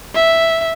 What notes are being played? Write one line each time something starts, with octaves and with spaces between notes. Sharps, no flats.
E5